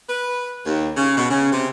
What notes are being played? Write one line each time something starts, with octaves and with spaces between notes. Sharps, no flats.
B4
D#2
C#3
B2
C#3
C3